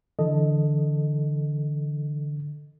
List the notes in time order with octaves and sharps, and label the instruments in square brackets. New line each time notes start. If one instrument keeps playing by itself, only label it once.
[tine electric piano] D3 [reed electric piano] E3 A4 D#5